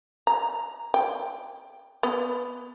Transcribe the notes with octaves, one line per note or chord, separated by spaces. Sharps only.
A#5
G5
B3